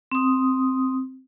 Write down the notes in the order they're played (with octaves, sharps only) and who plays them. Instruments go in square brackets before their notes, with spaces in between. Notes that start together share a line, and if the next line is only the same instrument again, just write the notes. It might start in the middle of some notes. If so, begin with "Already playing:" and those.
[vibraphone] C4 D#6